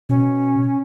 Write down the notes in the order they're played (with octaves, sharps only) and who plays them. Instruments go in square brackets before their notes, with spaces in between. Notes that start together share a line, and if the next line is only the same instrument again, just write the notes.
[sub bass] B2 [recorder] C#4